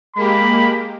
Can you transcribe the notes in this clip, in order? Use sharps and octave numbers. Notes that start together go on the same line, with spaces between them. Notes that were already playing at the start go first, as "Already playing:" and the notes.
G#3 A#3 G4 B5